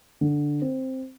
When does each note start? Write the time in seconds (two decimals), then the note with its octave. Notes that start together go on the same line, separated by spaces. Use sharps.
0.21 D3
0.62 C4